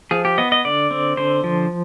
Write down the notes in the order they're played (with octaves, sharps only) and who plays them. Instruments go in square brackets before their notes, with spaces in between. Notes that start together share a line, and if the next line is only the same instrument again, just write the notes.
[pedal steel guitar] F3 G#4
G4
B3 D#5
D#5
D3 D5
C4
D3 C5
F3